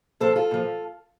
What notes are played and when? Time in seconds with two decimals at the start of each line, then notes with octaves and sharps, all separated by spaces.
0.20 A#2 F3 A4 C5
0.36 F4 A4
0.51 A#2 F3